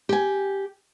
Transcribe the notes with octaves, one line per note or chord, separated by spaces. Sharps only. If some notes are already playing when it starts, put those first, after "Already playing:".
G4 G#5